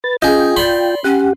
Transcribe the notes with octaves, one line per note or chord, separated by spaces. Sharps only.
B4 A6
C#4 F4 G#4 D#5 G5
D5 B5 C6
C#4 G4 F#5